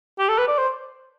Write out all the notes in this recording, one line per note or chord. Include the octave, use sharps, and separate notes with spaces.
G4
A4
B4
D5
C5